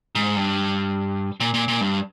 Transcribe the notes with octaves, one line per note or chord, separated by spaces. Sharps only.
G#2
G2
A#2
A#2
A#2
G2